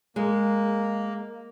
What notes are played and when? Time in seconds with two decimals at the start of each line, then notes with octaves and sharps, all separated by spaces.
0.16 G#3 A#3